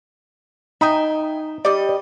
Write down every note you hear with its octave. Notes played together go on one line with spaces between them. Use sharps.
D#4 E5 G5 G#5
G3 D5 D#5